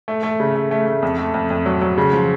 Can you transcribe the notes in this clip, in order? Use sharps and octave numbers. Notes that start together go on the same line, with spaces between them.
A3
A3
C#3
A3
A3
A3
F2
A3
F2
F2
F#3
F#3
C#3
F3